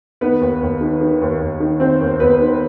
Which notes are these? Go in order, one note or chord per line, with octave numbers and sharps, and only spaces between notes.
D#3 B3 B4
D#2
D#2
D#3
D#3
D#2
D#2
D#3
D#3 C4 C5
D#2
D#2 B3 B4
D#3